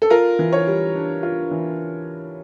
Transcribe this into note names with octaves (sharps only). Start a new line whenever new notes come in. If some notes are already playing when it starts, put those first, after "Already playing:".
A4
F4 A#4
E3
C#5
G3
D4
F4
E3